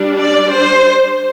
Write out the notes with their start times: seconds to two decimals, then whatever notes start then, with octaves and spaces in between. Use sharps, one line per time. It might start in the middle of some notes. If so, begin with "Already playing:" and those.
Already playing: G3 D4
0.20 D5
0.54 C5